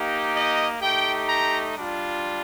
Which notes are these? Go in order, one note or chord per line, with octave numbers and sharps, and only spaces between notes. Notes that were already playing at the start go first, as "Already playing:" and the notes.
Already playing: A#3 D#4 G4
D#5
A3 D#4 G4 G5
A#5
G3 D4 F4